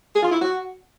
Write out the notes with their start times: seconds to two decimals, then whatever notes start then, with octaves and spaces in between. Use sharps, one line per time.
0.14 G#4
0.23 F4
0.32 E4
0.41 F#4